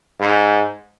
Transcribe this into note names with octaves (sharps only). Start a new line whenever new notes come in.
G#2